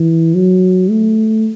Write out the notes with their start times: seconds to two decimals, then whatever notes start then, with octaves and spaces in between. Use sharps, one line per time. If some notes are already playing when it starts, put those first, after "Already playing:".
Already playing: E3
0.35 F#3
0.90 A3